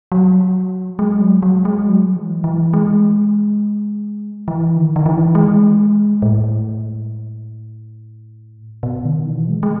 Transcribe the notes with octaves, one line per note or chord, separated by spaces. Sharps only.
F#3
G#3
F#3
F#3
G#3
F#3
E3
E3
G#3
E3
D#3
D#3
E3
G#3
A2
B2
D#3
E3
G#3
G#3